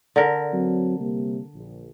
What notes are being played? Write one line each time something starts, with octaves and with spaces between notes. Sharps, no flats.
D3 A#4
F#3 C4
C3 G3 A#3
A#1